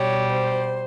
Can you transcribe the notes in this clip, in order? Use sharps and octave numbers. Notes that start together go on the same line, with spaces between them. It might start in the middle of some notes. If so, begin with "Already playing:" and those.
Already playing: B2 G3 C#5
C5